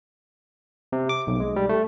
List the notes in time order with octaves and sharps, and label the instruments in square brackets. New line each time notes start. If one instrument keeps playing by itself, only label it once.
[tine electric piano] C3
D6
B1
G#3
G3
A3